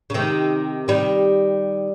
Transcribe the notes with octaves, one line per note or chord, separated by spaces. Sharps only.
C#3
C3 D#3
D#3 G3